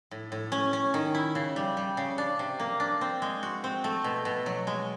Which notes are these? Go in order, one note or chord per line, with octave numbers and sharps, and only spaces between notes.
A2
A2
C#4
C#4
D#3
E4
C#3
G3
G3
C#3
D4
C3
A#3
D4
C4
G#3
F#4
C4
A3
B2
B2
F#3
G#3